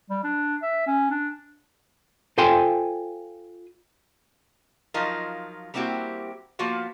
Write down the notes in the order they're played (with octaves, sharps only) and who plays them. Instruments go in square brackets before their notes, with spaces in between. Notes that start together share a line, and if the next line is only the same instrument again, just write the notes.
[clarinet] G3
D4
E5
C#4
D4
[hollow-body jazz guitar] F4 A4 C5 G5 G#5 C6
[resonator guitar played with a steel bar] F3 F#3 D#4 F4 A#4
G3 A#3 C4 E4 F#4 G4
F3 A#3 B3 F4 F#4 F5